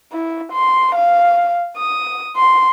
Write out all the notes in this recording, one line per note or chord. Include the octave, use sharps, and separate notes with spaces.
E4
C6
F5
D#6
C6